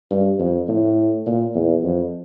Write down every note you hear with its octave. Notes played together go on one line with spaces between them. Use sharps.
G2
F2
A2
A#2
E2
F2